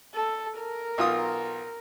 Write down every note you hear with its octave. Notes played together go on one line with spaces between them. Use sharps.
A4
A#4
B1 F4 D#6